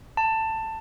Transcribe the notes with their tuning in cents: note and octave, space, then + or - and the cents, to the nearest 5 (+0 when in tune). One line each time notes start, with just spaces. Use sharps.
A5 +15